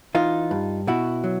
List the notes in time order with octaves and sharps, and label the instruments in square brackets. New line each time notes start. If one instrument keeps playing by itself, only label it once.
[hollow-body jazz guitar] E3 D#4 F4
G2
B2 E4 F#4
F#3